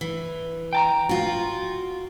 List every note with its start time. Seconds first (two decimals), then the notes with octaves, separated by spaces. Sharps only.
0.01 E3
0.73 G5 A5 A#5
1.09 F4 F#4